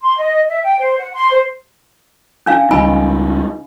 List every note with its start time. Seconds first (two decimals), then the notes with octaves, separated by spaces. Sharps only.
0.02 C6
0.17 D#5
0.48 E5
0.63 G5
0.79 C5
0.98 F#5
1.13 C6
1.31 C5
2.46 C#4 D4 F5
2.71 C#2 G3 C#4 D#4 G#5 B5